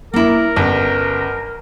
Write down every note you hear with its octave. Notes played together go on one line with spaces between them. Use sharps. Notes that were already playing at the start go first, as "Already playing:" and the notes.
A#3 E4 A#4
G1 C#4